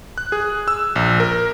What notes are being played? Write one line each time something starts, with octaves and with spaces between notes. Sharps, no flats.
F#6
G#4
E6
A#1
A#4